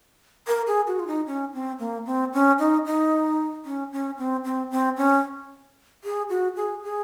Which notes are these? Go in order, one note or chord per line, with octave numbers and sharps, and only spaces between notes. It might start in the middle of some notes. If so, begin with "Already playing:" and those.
A#4
G#4
F#4
F4
D#4
C#4
C4
A#3
C4
C#4
D#4
D#4
C#4
C#4
C4
C4
C4
C#4
G#4
F#4
G#4
G#4